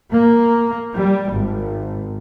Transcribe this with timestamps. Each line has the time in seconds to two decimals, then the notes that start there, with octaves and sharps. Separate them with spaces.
0.10 A#3
0.96 G3
1.32 G#1